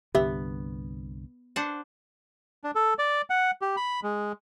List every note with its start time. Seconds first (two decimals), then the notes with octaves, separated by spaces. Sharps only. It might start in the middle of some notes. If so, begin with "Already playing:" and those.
0.15 C2 G2 D3 B3 G4 E5
1.56 D4 C5 F#5
2.64 D4
2.75 A4
2.99 D5
3.30 F#5
3.62 G4
3.77 B5
4.03 G#3